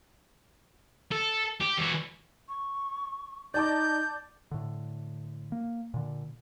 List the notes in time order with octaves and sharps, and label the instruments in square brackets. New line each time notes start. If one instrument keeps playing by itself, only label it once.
[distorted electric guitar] A4
G4
E3 F#4
[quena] C#6
[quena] D#4 [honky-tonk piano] D5 A5 D6 [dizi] G6
[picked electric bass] A2 D3
A#3
A#2 D3